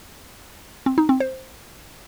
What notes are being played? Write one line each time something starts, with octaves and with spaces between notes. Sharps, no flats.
C4
D#4
C4
C5